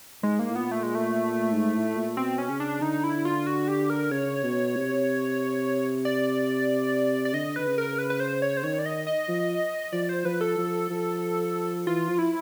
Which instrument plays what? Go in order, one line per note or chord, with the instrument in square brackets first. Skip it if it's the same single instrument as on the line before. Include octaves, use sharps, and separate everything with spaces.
[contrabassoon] G#2 [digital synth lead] G#3
[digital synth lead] A#3
[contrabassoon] A2
[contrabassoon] A#2 [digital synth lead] B3
[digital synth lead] A3
G#3
A3
[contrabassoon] G#2
A2
A#2
[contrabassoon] B2 [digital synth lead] C4
[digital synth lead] C#4
[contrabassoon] C#3
[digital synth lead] D4
[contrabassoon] D3 [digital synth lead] D#4
[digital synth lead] E4
F4
F#4
G4
A#4
[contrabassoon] C#3 [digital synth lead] C#5
[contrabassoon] B2
C3
[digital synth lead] D5
D5
[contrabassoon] D3 [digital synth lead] D#5
[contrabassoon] D3 [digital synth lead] B4
[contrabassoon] C#3
[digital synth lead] A#4
B4
B4
C5
C#5
C5
[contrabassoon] D#3 [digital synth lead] C#5
[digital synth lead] D5
D#5
D#5
[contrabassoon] F3
[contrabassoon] F3 [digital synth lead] D5
[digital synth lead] C5
[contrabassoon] F3 [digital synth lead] B4
[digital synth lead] A4
[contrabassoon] F3
F3
[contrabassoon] E3 [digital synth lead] F4
[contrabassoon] F3
[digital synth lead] E4